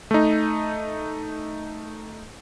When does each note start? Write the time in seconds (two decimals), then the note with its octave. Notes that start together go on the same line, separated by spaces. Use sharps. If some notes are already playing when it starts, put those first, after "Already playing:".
0.11 A3 D#4